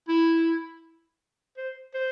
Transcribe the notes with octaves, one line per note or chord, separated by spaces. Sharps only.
E4
C5
C5